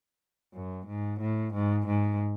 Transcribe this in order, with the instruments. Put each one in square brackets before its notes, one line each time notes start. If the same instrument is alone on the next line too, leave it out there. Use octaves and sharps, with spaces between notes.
[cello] F#2
G#2
A2
G#2
G#2